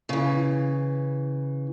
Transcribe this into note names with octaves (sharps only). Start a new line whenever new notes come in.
C#3 E3